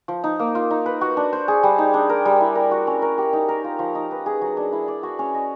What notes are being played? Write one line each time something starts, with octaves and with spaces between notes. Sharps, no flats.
F3
D#4
A#3
F4
D#4
B4
F#4
D4
C5
G#4
G3
D#4
D4
A#4
G3
E4
A#4
F#4
C#4
A#4
G4
D#4
A#4
F4
F3
D#4
B4
G#4
F#3
D4
E4
D5
F#4
C#4
D#5